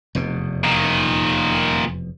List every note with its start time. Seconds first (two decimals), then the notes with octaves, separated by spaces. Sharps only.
0.15 F1 E2 B2
0.64 A#2 D#3